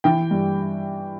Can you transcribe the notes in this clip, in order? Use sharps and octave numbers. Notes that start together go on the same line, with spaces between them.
E3 G5
G2